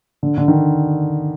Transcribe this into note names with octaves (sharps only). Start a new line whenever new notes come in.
D3
D3
D#3